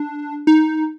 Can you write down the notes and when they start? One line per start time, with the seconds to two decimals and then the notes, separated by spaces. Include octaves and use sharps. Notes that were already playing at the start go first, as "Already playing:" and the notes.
Already playing: D4
0.47 D#4